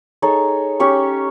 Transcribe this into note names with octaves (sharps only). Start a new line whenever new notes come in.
D#4 G#4 A4 C#5
C#4 G4 C#6